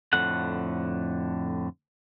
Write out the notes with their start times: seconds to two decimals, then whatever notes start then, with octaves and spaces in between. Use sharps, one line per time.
0.13 F2 A2 D3 F#5